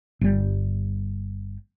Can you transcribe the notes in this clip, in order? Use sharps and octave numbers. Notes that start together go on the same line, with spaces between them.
G1 G3